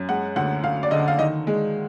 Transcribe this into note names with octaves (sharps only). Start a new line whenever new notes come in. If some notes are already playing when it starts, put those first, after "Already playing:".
Already playing: F#2
G#3 F#5
D2 F#5
D2 F5
D5
D3 D#5
F5
D#3 D#5
G#3